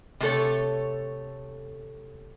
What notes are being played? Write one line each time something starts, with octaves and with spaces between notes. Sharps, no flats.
C3 A3 A4 C#5